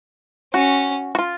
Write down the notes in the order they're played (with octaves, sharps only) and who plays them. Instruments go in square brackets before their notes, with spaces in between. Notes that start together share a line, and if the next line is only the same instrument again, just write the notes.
[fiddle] C#4 [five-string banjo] F#4
[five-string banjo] F#4
F4